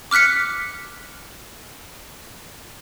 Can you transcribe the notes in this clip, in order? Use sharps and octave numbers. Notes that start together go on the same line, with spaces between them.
D6 F6 F#6 B6 C#7